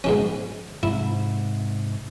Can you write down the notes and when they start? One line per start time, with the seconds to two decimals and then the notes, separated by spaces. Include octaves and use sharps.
0.04 G#2 B2 C#4
0.83 G#2 C3 E4